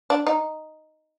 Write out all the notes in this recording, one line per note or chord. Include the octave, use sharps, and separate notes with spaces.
D4
D#4